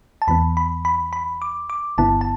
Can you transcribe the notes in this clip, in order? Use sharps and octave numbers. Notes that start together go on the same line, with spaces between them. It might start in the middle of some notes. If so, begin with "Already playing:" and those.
A5
E2 E3 B3 B5
B5
B5
B5
D6
D6
G1 G2 D3 B3 E4 A5
A5